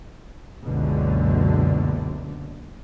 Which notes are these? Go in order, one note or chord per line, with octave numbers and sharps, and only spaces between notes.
F#1 C#2 F#2 B2 D3